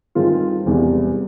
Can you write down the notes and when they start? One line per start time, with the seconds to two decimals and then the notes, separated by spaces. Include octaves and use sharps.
0.15 G2 D#3 G#3 C4 F4
0.66 E1 E2 C3 E3 G3